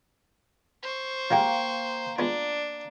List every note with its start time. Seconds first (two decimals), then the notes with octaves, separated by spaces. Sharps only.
0.83 C5 C#6
1.31 F3 G#3 A#3 G4 F5 G5
2.18 G#3 B3 D4 F4